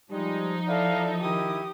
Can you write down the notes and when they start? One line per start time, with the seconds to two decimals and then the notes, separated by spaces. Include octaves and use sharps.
0.11 F3 G3 G#3 D#4
0.68 E4 A4 D5 F5
1.22 D#3 E4 G4 D#6